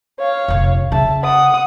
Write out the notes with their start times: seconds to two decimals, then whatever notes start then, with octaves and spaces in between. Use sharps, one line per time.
0.19 C#5 F5
0.48 F1 A#1
0.92 C#3 C#4 E5 A5
1.22 F#5 D#6